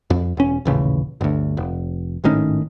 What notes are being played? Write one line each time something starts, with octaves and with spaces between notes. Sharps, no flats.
F2
E1 C#4
D#1 A1 C#3
G1 D2
F1
G#1 A2 D#3 C#4